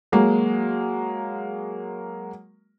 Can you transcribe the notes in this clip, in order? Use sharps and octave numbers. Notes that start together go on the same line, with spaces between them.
F#3 G#3 A#3